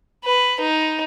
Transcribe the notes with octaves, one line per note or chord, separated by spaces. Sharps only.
B4
D#4